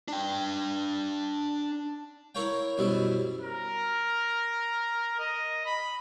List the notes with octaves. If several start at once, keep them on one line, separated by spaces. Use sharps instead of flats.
D4 G5
E4 A#4 C#5 F5 G5
F#2 B2 G3 C4 E4
A#4
D#5
B5